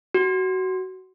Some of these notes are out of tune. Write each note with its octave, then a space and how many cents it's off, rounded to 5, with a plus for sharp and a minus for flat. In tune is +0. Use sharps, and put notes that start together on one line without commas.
F#4 +20